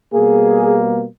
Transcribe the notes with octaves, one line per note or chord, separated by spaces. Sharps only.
B2 G3 A#3 G#4